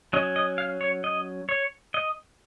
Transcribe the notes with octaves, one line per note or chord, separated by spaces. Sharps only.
F#3 C#4 D#5
D#5
F5
C#5
D#5
C#5
D#5